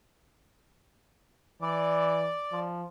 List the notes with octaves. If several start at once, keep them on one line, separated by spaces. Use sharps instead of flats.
E3 D5
F3